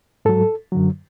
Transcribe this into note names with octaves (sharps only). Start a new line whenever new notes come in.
G#2 F#3 A4
F#2 D3 F#3